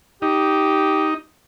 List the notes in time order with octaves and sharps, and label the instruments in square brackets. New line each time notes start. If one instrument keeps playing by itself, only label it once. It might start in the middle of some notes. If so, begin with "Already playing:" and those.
[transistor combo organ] D#4 [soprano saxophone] G4